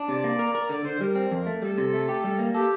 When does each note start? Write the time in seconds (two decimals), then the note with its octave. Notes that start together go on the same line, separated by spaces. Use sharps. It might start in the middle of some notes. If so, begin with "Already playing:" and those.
Already playing: D4
0.08 C3 D5
0.24 A#3
0.39 A#4
0.55 A#4
0.69 D3 D5
0.85 D3 C5
1.01 G3 A#4
1.15 C4
1.31 F2
1.46 A3
1.62 G3 A4
1.78 C3
1.94 A3
2.09 G4
2.24 G3
2.39 A#3
2.55 G4 A4